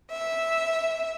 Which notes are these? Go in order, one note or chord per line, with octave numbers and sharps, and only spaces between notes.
E5